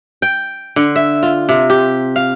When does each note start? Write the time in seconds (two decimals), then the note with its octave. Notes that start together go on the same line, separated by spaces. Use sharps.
0.22 G5
0.76 D3
0.96 E5
1.23 F4
1.49 C3
1.70 G4
2.16 F5